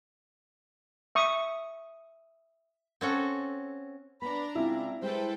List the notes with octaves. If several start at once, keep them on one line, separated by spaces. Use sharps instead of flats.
E5 C#6 D#6
C4 C#4 F#4 A4
B3 D4 A#5 B5
C#3 G#3 C4 E4 F4
G3 G#3 A4 B4 C5 G5